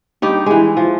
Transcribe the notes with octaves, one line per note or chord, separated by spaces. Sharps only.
G2 D#4 G4
E3 G#3
F3